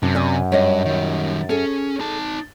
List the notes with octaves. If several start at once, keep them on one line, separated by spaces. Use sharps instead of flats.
F#2 C3 D4
D5 G#5
G2 C#5 D#5
D#3 G3
C#4 G#4 A4
D#4 A5